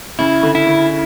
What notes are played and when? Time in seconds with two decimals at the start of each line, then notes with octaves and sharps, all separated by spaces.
0.19 C#3 E4
0.43 D3
0.55 E4
0.67 D3